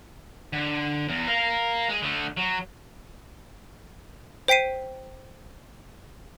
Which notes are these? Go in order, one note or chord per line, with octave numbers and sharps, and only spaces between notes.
D3
E2
A#4 F5
G#3 G#4
D3 A3
F#3
C5 G5 B6 C7 D#7